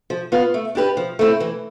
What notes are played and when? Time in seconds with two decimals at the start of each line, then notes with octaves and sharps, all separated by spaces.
0.10 F3
0.32 B3 F4 B4
0.54 A3
0.75 D4 G4 B4
0.97 F3
1.19 A3 C4 E4
1.40 E3